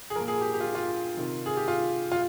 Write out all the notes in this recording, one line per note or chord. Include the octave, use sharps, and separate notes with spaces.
G#4
A#2 F3 A#4
G#4
G4
G4
F4
F4
C3 D#3
G#4
G4
F4
F4